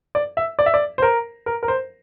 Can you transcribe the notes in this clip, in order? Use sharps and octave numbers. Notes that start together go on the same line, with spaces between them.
D5
E5
D5
E5
D5
C5
A#4
A#4
A#4
C5